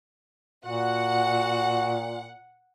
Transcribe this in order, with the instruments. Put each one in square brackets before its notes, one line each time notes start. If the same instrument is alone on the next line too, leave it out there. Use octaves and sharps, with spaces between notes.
[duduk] A#2 [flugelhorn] F#4 [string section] F#5